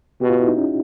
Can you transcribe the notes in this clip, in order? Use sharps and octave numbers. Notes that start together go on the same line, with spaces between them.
B2 G4
F4
E4
D#4
C#4